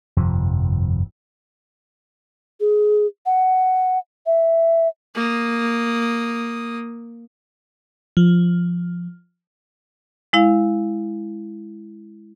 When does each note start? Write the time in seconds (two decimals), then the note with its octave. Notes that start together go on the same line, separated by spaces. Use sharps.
0.17 G1 F2 C3 F3
2.60 G#4
3.26 F#5
4.26 E5
5.15 A#3 D#6
8.17 F3
10.33 G#3 E4 F5